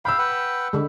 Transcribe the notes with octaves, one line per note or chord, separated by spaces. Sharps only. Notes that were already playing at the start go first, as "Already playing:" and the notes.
F5 G5 B5 E6
B4 F#5 G5
D3 G#3